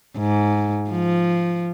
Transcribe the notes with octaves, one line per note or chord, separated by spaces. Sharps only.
G#2
F3